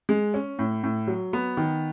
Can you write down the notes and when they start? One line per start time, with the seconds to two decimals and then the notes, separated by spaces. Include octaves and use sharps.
0.09 G#3
0.34 C#4
0.59 A2
0.84 A2
1.07 F#3
1.33 B3
1.57 D#3